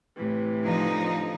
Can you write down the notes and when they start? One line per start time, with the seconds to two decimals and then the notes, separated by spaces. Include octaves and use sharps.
0.17 A2 C3 E3
0.63 D3 F3 D#4